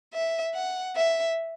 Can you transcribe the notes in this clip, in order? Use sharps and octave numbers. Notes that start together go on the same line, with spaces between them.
E5
F#5
E5